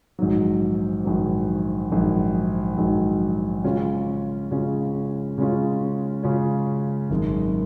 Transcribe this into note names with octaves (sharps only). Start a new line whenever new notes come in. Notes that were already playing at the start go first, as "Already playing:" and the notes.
A#1 G#2 D#3 F#3
A#1 G#2 D#3 F#3
A#1 G#2 D#3 F#3
A#1 G#2 D#3 F#3
C#3 G#3 C#4 F4
C#3 G#3 C#4 F4
C#3 G#3 C#4 F4
C#3 G#3 C#4 F4
G#1 F#2 D#3 G#3